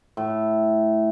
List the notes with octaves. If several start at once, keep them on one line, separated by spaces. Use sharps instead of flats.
A2